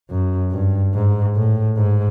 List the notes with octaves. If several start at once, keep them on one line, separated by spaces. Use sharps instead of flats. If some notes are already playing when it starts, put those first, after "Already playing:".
F#2
G2
G#2
A2
G#2